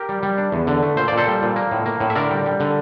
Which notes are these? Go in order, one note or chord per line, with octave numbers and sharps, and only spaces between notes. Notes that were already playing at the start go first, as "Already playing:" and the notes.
Already playing: G4 A#4
G3
G3
D4
E2
D3
A3
A#2 C5
A#2 D5
A4 C5
G3
A#2
A#3
A2
A#3
A2
E5
D3 A#4 D5
G3
G3
D3